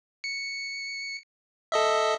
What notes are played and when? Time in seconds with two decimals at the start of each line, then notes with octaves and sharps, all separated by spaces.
0.24 C#7
1.72 A4 D#5 E5